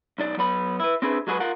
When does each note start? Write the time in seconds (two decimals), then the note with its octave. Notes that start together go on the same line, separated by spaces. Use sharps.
0.18 B1 D#4 D5
0.37 F#3 B3 B5
0.80 E4 B4
1.02 C4 D4 E4 G#4 B4
1.27 F#3 G#3 F#4 G#4 B4
1.40 F4 A#4 F#5